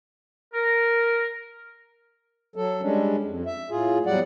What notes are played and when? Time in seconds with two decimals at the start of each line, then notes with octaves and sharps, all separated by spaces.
0.54 A#4
2.56 F#3 A4
2.82 G3 G#3 C#4 D4
3.24 F2
3.46 E5
3.70 A2 F4 G#4
4.06 E2 F#3 G3 D5 F#5